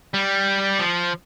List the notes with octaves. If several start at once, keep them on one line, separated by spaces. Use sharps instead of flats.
G3
F3